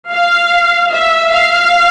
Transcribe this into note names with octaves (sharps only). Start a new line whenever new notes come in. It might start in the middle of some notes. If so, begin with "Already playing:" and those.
F5
E5
F5